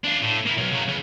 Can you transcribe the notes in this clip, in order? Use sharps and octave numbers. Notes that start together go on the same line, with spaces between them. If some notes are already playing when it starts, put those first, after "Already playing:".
D4 F4
A2
A#3 E4
B1
C#3 F#3
C#2